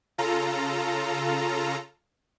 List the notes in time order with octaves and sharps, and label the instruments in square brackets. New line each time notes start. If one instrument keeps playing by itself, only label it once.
[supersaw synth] C#3 F4 A4 A#5